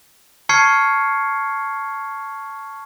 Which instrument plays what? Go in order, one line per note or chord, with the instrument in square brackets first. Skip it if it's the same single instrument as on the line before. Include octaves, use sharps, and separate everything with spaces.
[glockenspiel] A5 C#6 F6 G#6 C7 C#7